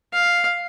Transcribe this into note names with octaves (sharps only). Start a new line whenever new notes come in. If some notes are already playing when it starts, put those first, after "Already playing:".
F5